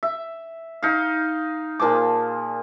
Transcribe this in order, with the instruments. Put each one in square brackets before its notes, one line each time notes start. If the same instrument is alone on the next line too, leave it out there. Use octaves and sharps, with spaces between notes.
[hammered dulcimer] E5
D#4 F5
A#2 F3 G#4 D6